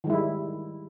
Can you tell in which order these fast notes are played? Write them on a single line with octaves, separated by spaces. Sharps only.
D#3 G#3 E4 G3